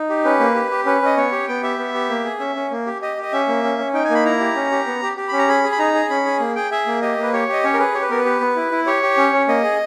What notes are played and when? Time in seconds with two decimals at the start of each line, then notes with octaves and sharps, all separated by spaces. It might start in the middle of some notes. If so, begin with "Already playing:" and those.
Already playing: D#4
0.09 G4
0.25 C#4 B4
0.40 A#3
0.55 G4
0.71 G4
0.86 C#4 B4
1.02 C#4 D#5
1.17 B3 C#5
1.32 G4
1.48 B3 G5
1.63 G4 E5
1.79 B3
1.94 G4
2.10 A#3
2.25 G#4
2.40 C#4 E5
2.56 C#4
2.71 A#3
2.86 G4
3.02 G4 D#5
3.17 G4 D#5
3.33 C#4 E5
3.48 A#3
3.63 C#4
3.78 C#4
3.94 D#4 G5
4.04 G#5
4.10 A#3 B5
4.25 E4 A#5
4.40 G4
4.56 C#4
4.71 G4
4.86 B3
5.02 G4
5.17 G4
5.28 C#4 B5
5.38 A#5
5.48 G#4 B5
5.63 G#4
5.72 B5
5.79 D#4 A#5
5.94 G#4
6.10 C#4 B5
6.25 G#4
6.40 A#3
6.56 G#4 G5
6.71 G#4 E5
6.87 A#3
7.02 G4 D#5
7.18 A#3 B4
7.33 G4 C#5
7.48 G4 D#5
7.63 C#4 C#5
7.74 A#4
7.79 G#4 B4
7.94 G4 C#5
8.02 B4
8.10 B3 A#4
8.18 B4
8.25 G4
8.41 B3
8.56 E4
8.72 E4
8.87 G4 C#5
9.03 G4
9.17 C#4
9.33 C#4
9.48 A#3 D#5
9.63 G#4